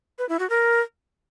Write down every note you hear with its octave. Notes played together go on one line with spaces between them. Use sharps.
B4
E4
F#4
A#4